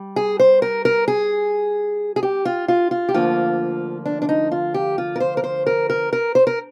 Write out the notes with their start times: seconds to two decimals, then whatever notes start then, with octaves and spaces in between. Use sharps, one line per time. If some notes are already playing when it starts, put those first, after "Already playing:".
Already playing: G3
0.16 G#4
0.39 C5
0.62 A#4
0.85 A#4
1.08 G#4
2.16 G#4
2.23 G4
2.45 F4
2.68 F4
2.91 F4
3.09 G4
3.14 D2 D3 F3 A#3 F4
4.06 D4
4.22 D4
4.29 D#4
4.52 F4
4.74 G4
4.98 F4
5.16 A#4
5.20 C5
5.37 A#4
5.44 C5
5.66 A#4
5.90 A#4
6.13 A#4
6.35 C5
6.47 A#4